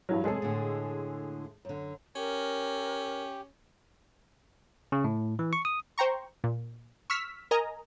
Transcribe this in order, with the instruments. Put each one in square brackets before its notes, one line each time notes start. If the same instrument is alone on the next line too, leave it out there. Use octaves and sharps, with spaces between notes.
[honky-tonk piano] G2 E3 F#3
[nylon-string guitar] F#2 C3 [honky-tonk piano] G#3 G#4 A4
[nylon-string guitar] A2 D3
F#2 D3
[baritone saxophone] C#4 [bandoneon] G4 [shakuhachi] A#4
[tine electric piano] C#3
A2
E3
C#6
D#6
[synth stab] C5 G5 A#5 C#6
A#2
C#6 E6 F6 B6
A#4 D#5 G#5 A#5